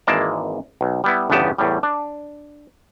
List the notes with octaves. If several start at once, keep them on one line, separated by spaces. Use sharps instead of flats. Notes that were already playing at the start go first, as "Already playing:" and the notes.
G#1 E3 G#3 A#3 D5 A5
B1
G3 B3 E4
G1 E2 C#3 B3 G4 A5
E2 A2 G3
D4